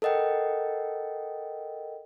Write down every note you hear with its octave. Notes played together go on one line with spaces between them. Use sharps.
A4 A#4 D#5 F#5 G5